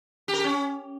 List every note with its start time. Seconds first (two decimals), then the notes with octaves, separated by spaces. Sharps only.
0.28 G4
0.33 A#4
0.39 G4
0.44 C#4